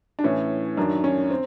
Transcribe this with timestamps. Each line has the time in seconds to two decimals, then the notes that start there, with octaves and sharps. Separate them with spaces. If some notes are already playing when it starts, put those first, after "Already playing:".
0.19 D4
0.24 A2 E3 C#4
0.77 F#2 D#3 D4
1.04 C#4
1.31 C4